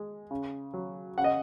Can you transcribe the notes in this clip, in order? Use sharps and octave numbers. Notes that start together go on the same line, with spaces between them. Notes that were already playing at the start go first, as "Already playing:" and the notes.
Already playing: G#3
C#3
F#3
C#3 F#5
D#5